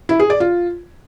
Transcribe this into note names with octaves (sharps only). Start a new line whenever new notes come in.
E4
G#4
D5
F4